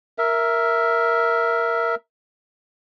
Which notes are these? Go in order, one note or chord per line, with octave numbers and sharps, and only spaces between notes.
A#4 E5